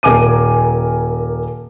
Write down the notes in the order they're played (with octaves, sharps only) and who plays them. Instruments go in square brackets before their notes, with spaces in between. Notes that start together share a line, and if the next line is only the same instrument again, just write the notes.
[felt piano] D#1 A#4 G#5 D6 D#7